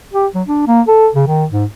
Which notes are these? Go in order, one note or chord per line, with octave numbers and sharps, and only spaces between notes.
G4
F#3
D4
A#3
A4
C#3
D#3
G#2